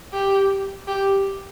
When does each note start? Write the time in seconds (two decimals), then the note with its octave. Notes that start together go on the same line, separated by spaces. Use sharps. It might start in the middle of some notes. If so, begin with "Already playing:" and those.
0.13 G4
0.88 G4